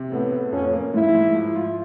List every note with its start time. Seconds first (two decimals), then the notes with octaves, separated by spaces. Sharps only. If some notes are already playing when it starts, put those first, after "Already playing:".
Already playing: C3
0.12 A2 B3
0.32 B3
0.52 F2 C#4
0.73 A#3
0.94 G#2 E4
1.14 G#2
1.35 F3
1.56 F4